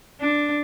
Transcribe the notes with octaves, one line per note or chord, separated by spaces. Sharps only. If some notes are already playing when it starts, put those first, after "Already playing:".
D4